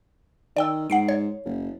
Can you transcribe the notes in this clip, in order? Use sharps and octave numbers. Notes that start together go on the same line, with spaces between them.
D#3 D5 G5 E6
G#2 F#5 C7 D7
C#5
F#1